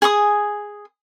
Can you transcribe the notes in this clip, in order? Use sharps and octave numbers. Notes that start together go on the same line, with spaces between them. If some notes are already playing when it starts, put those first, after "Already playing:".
G#4 G#5 C6 D#6